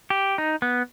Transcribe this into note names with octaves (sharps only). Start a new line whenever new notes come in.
G4
D#4
B3